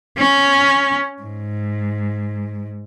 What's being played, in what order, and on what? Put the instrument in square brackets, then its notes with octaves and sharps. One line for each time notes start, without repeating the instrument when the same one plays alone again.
[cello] C#4
G#2